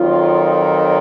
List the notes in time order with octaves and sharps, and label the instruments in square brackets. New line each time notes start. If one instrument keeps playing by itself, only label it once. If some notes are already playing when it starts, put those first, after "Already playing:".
Already playing: [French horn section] F2 D#3 F#3 F4